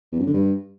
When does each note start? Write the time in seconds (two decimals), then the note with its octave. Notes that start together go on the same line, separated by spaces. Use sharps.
0.12 E2
0.19 F#2
0.26 D3
0.33 G2